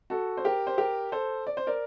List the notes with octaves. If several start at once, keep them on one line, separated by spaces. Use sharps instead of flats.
F#4 A4
C5
G4 A#4
C5
G4 A#4
A4 C5
D5
C5
A#4 D5